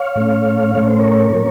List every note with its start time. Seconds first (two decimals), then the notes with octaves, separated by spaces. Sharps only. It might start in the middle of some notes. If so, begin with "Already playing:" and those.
Already playing: C#5 F5
0.15 A2 A3 C#4
0.75 A2 A3 C#4 C#5
0.87 C5
0.99 A#4 C#5
1.33 A2 F#3 A#3 C#4